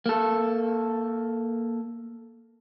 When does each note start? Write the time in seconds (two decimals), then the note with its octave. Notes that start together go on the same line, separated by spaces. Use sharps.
0.06 A#3 A4